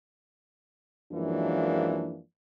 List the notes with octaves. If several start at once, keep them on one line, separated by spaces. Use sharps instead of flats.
F#2 E3 F3 G#3 A#3 D4